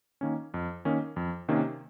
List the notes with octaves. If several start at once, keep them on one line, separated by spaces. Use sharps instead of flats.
D#3 A#3 C#4
F2
D#3 A#3 C#4
F2
C3 D#3 A#3 C#4